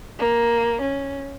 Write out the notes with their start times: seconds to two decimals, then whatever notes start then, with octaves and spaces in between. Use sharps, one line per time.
0.19 A#3
0.81 C#4